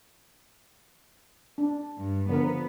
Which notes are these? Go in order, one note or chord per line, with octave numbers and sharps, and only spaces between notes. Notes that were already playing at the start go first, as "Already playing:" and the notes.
D4
G2
D3 F3 B3 A#4